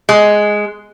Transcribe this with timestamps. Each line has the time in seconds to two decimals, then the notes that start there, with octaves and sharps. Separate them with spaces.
0.09 G#3